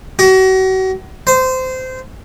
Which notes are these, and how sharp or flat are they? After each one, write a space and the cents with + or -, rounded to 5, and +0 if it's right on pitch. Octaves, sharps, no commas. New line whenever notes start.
F#4 +35
C5 -20